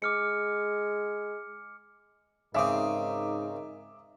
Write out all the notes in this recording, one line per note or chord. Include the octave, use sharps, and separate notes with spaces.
G#3 D6 F6 C#7
G#2 C#3 C4 D#4 A#4 E5 D6 D#6